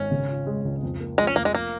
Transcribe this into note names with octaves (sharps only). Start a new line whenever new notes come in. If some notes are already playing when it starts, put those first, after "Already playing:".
Already playing: G#1 C#4
C#3
F4
G#3
C#2
F2
A#3
F3 G#3
C#4
F1 A#3
G#3
F3 A#3